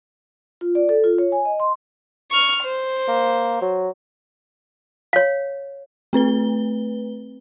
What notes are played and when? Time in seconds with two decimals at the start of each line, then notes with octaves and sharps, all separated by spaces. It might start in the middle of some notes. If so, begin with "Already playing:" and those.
0.61 F4
0.75 D5
0.89 A4
1.04 F4
1.18 C#5
1.32 G#5
1.45 D#5
1.60 C6
2.31 C#6 F6
2.64 C5
3.08 A#3
3.62 F#3
5.13 C#5 F5
6.13 A3 C4 B4 G7